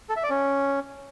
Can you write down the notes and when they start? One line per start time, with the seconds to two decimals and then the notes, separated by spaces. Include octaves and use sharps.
0.09 A4
0.16 E5
0.23 D5
0.30 C#4